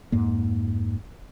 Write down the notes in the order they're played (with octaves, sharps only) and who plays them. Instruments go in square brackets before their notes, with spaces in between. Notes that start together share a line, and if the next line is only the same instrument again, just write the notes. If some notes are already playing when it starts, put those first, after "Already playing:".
[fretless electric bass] F2 G#2 A#3